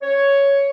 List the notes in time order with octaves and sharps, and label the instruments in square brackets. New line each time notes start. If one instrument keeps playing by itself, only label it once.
[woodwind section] C#5